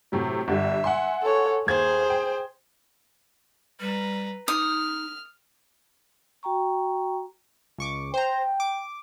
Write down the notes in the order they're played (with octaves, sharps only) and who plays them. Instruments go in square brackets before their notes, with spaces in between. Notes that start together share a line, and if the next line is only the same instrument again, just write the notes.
[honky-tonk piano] A2 C3 F#3
[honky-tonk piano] G1 D3 G3 [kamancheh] E5
[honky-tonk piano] F#5 G#5 C6
[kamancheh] A4 C#5
[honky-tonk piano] D#2 G#6 [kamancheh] G#4 C5
[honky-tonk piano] G5
[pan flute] G3 [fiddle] B4 A#5
[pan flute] D#4 [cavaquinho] D#6 [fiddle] F6
[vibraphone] F#4 G5 A#5 C#6
[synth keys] C#2 C#6 D6
[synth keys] C5 A#5 [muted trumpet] G5
[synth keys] D6